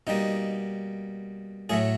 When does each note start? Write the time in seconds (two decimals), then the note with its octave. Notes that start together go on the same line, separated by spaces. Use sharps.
0.07 B2 G3 A#3 D#4
1.69 A2 F#3 A3 G#4